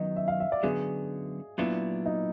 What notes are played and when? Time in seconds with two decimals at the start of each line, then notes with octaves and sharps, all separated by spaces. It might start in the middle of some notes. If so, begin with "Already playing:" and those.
Already playing: F#2 D#3 F#3 B3 D#5
0.16 E5
0.28 F5
0.40 E5
0.52 D5
0.63 F#2 D3 F#3 B3 G#4
1.58 A#2 F#3 B3 D4 E4 F4
2.06 D#4